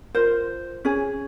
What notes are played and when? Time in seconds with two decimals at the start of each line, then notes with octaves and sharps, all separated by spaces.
0.15 F4 A#4 C5
0.85 C#4 G#4